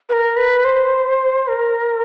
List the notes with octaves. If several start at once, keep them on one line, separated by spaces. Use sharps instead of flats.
B4
A#4
B4
C5
A#4